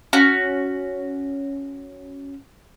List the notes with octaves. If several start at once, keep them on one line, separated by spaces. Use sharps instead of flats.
C#4 F#4